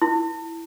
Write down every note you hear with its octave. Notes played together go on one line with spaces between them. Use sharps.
E4